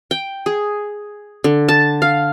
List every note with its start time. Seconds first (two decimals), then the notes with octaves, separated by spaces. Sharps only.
0.11 G5
0.46 G#4
1.44 D3
1.69 A5
2.02 F5